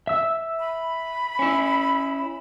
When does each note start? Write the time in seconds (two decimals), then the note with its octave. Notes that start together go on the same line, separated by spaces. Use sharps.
0.07 E5 E6
0.60 B5
1.39 C#4 E4